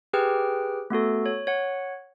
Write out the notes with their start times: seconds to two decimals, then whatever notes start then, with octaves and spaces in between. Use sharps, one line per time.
0.13 G4 G#4 B4 G5 F6
0.90 A3 B3 F#4 A4
1.26 C#5
1.47 C#5 F#5